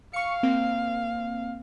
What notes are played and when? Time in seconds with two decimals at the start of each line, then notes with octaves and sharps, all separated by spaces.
0.13 F5 C#6 C#7
0.43 A#3 C4